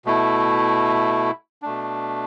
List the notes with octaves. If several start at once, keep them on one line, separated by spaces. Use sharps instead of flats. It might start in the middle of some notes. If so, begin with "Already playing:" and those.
B2 A3 E4
B2 A3 D4